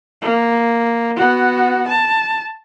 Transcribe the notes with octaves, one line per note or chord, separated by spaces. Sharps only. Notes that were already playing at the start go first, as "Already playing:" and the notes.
A#3
B3 F#4
A5